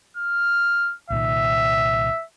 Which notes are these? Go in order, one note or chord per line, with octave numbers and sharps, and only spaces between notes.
F6
C2 A#2 D#3 E5